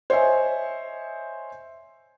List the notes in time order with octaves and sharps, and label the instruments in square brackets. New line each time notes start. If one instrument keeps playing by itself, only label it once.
[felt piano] C5 C#5 D#5 E5 G#5